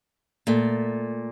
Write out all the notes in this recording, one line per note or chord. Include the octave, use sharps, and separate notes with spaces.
A#2 A3